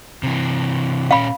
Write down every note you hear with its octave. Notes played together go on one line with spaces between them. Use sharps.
C3 E3
A#2 C#4 F5 B5